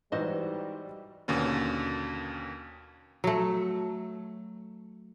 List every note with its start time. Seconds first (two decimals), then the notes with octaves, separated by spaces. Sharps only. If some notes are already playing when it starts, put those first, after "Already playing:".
0.12 G#2 E3 G3 F#4 C5 D#5
1.28 D#2 B2 D3 A#3 C#4
3.24 F#3 A3